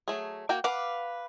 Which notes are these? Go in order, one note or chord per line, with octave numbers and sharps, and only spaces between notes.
F#3 A3 G#4
A#3 F#4 G5
B4 F5 F#5 D6